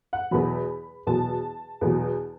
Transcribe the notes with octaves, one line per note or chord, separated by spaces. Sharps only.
F#5
E2 B2 F#3 B5
E2 B2 F#3 A5
E2 B2 F#3